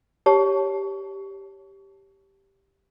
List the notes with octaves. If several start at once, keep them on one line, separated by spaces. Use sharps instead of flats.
G4 C#5 A5